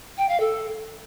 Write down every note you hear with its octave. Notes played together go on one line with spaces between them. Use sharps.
G5
F5
A4